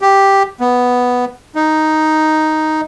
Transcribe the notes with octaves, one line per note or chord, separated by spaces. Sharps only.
G4
B3
D#4